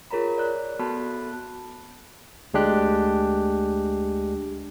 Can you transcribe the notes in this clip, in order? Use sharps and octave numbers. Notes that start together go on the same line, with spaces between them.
F4 G#4 A#4 C#5 A#5 B5
C#5 D5 F#6
B3 F#4 A4 A5 B5 F#6
D2 G#3 D4 G4 F#6